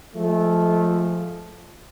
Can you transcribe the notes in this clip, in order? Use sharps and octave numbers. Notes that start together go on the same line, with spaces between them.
F3 G#3 A3